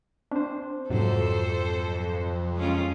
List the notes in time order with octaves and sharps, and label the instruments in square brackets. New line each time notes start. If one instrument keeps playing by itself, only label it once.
[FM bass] C4 [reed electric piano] D4 C5
[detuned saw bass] F2 [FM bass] G#2 [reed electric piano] C3 F#3 [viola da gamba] A4 C5
[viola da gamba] G#3 C#4 F4